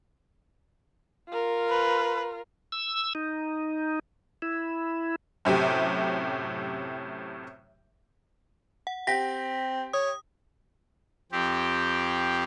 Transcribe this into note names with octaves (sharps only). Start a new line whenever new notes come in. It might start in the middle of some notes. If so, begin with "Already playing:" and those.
F4 A#4
B4
E6
D#4
E4
F#2 A2 C3 G4
F#5
C4 G4 A#6 B6
C#5 D#6
F2 C4 G4